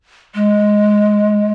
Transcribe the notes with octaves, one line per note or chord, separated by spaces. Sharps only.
G#3